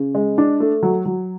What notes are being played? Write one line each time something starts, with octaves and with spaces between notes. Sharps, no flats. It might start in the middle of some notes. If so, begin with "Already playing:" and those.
Already playing: C#3
G#3
D4
A3
F#3
F#3